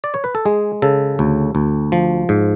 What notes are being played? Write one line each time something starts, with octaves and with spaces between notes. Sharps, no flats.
D5
C#5
B4
A4
G#3 G#4
C#3 A4
D2
D2
F3
G#2